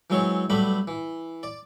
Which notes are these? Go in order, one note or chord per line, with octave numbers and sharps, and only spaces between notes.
E3 F#3 G#3 C4 C#5
B1 G3 A3 B3 B5
E3
D5